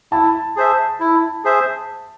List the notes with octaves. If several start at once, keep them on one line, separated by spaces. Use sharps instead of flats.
E4 A5
G#4 C5 E5
E4
G#4 C5 E5